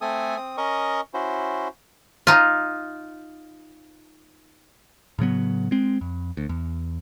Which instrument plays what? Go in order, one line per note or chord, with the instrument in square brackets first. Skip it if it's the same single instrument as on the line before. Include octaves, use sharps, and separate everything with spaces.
[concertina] A3 C4 A4 G#5 D#6
C4 D#6
C#4 A#4 D#5 C#6 D#6
C#4 E4 F#4 C5
[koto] D#4 F4
[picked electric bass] A2 C#3 F#3 B3
G#3 C4
F2
D2
E2